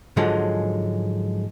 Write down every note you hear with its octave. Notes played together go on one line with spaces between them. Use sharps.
G#2 D3 F3 F#3 G#3